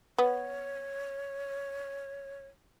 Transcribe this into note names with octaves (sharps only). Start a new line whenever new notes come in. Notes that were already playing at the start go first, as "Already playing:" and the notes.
B3 C#5